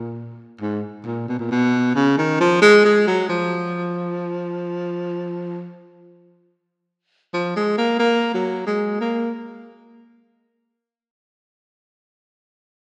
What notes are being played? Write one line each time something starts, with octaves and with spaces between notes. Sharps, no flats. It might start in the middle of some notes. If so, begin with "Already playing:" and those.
Already playing: A#2
G#2
A#2
B2
A#2
B2
C#3
D#3
F3
G#3
G#3
F#3
F3
F3
G#3
A#3
A#3
F#3
G#3
A#3